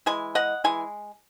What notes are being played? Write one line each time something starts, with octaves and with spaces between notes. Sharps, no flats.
E3 G#3 G#5
D#5 F#5
E3 G#3 G#5